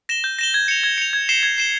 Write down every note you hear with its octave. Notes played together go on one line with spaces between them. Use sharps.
A#6 E7 G7
G6
A#6 E7 G7
G#6
C#7 F7
G#6
C#7 F7
G#6
C7 E7 G7
G#6
C7 E7 G7